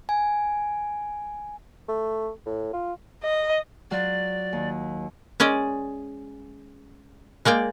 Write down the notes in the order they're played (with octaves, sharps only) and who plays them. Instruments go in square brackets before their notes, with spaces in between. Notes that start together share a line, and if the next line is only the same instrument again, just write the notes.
[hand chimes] G#5
[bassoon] A3
A2
F4
[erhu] D#5
[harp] F#3 F4 [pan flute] D5
[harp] D#2
[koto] G#3 C#4 D5 D#5
G#3 A#3 D5 G5